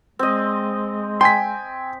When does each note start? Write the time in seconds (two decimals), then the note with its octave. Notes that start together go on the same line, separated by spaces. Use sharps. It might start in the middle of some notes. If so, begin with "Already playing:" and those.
0.19 G#3 C4 D#5
1.21 G5 G#5 C6 B6